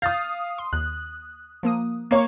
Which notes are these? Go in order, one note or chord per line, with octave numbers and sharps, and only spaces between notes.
F5 D#6 G6 A6
C6
D#2 F#6
F3 A#3 D#6
A#3 C#5